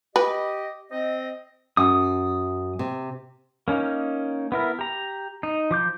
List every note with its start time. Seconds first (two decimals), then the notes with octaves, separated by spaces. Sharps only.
0.16 G4 B4 D#5
0.91 C4 D#5
1.77 F#2 D#6
2.79 C3
3.68 A#3 C#4 D#4
4.52 B3 E4 A#4
4.79 G4 A#5
5.43 D#4
5.71 F3 D6 G6